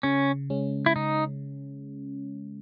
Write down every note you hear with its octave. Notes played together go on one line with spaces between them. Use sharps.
C#3 C#4
G#3 C#4
E4
C#3 D#4